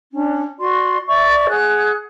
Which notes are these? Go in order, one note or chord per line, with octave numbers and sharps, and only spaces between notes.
C#4 D4
F#4 D5 C6
D5 E5 C#6
G#4 F#5 F#6